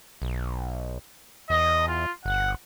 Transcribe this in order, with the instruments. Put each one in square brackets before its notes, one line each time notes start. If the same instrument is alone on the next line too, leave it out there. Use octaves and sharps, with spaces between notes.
[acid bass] B1
[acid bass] E2 [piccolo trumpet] D#5
[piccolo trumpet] F4
[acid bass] G1 [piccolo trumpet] F#5